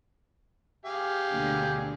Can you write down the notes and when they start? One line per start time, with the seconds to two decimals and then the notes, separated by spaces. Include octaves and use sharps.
0.86 G4 G#4 F5
1.32 D2 B2 D3